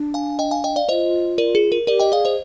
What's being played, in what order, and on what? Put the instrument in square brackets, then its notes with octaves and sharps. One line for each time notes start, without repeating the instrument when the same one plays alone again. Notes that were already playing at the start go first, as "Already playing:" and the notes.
Already playing: [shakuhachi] D4
[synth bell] F5 G#5
D#5 G5
F5 G#5
D#5 G5
D5 F5
[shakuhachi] F4 [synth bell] C5 D#5
[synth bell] A#4 D5
G#4
A#4
[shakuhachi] G4 G#4 [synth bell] A#4 D5
[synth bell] D#5 G5
[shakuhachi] G#4 [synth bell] D5 F5
[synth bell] C5 D#5